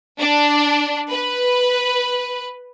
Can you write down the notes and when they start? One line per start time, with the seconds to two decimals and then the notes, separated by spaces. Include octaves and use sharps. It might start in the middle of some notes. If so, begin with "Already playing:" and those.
0.19 D4
1.10 B4